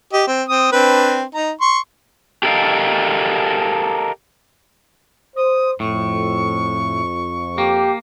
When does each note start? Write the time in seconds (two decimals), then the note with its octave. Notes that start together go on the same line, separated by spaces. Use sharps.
0.13 G4 D#5
0.27 C4
0.48 C4 D#6
0.72 C4 D4 B4
1.34 D#4 A#5
1.61 C6 C#6
2.43 G4 A4 A#4 C5 D#5 F5
5.36 C5 D#6
5.80 F2 A2 C#6
7.58 A#3 G4